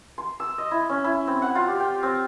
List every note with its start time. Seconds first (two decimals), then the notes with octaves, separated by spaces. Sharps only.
0.18 C6
0.40 E6
0.58 D#5
0.71 E4
0.89 C#4
1.04 E4
1.27 C4
1.42 F#5
1.55 F4
1.68 G4
1.80 G5
2.03 C4